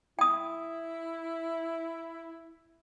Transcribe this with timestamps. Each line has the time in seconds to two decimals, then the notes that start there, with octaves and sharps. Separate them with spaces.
0.19 E4 G5 D#6